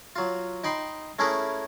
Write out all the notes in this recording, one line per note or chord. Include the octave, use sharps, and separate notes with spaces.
F#3 F4
D#4 G5 B5 C6
A3 C#4 E4 G#4 A#4 B4